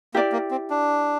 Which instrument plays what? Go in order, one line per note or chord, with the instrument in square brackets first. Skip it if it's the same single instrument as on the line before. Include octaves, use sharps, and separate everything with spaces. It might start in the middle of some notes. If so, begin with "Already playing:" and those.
[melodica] A#3 [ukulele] E4 G4 D5
[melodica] A#3
C4
D4